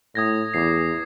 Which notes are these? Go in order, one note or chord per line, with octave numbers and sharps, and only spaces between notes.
A2 D#6 G#6 A#6
E2 D6 C7